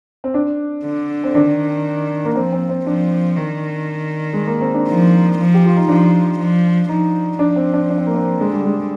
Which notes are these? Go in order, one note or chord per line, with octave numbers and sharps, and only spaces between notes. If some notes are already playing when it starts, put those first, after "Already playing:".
C4
D4
D3
C4
D#3 D4
A#3
F3 C4
C4
C4
F3 D4
D#3
G#3
A#3
C4
D4
F3 D#4
F3
G4
F4
D#4
F3 D4
F3
F3 D#4
F3 D4
C4
D4
D4
C4
A#3
C4
D3 G#3
G3
G#3